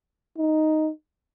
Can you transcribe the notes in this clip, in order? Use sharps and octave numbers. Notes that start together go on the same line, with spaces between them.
D#4